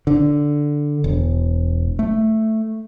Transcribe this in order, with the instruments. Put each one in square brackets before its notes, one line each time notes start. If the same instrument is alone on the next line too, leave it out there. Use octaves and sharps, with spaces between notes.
[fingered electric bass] D3
E1
A3